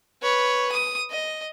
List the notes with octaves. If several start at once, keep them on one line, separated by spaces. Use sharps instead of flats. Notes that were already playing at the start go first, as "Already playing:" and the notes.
B4 C#5
D#6
D#5